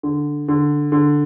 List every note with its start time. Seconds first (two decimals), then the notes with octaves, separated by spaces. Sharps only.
0.03 D3
0.48 D3
0.92 D3